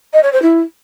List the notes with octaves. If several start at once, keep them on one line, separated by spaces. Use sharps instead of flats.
D#5
C#5
C5
E4